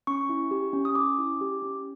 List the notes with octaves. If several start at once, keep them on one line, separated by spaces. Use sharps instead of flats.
C#4 C#6
E4
G4
C#4
D#6
C#4 D6
E4
G4
C#4